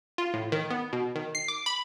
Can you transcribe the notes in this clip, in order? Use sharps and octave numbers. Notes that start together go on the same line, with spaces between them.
F4
A2
D#3
B3
B2
D#3
C7
D6
B5